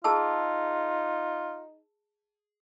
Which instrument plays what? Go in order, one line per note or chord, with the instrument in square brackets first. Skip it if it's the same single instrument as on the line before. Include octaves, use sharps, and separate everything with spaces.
[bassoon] D#4 [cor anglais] F4 [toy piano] G#4 A5 E6